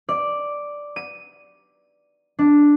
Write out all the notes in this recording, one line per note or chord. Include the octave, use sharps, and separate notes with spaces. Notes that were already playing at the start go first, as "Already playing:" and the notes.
D5
D#7
D4